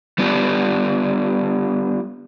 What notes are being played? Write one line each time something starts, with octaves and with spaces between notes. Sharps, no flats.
G3 B3 D4 F4 G4